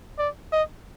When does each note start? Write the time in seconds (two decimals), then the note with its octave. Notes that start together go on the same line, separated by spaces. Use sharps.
0.18 D5
0.52 D#5